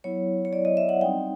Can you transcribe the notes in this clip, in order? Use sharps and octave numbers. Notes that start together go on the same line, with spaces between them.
F#3 B3 E4 C#5
C#5
D5
D#5
E5
F#5
G3 C4 D#4 G5